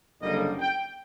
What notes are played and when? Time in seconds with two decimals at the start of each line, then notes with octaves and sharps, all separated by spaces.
0.21 F#1 F#2 D3 G3 A#3 D#5
0.60 G5